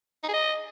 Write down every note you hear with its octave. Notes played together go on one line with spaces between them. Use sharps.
D#4
G#4
D#5